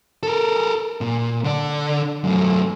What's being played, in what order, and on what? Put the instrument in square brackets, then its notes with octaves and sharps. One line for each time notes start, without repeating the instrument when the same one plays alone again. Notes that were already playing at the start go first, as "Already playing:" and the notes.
[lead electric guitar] A4 A#4
A#2
D3 D5
F#2 A3